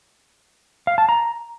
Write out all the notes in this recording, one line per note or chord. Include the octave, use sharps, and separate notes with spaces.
F5
A5
A#5